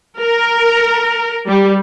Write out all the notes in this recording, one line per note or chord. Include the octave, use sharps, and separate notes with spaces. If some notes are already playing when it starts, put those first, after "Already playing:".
A#4
G3